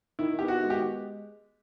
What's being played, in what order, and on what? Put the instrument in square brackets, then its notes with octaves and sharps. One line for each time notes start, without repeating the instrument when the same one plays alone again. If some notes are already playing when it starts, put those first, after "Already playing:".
[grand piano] D#3 E4
B3 G4
F#4
G#3
G4